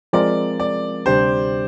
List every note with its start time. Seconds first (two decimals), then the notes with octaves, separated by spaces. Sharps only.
0.13 F3 G#3 C4 F4 A#4 D5
0.60 D5
1.06 D2 C3 G3 D4 G4 C5